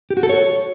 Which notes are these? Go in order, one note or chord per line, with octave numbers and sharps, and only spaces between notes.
G4
F#4
A4
C#5